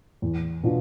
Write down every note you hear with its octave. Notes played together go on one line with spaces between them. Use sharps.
E2
B2 B3 D4 F4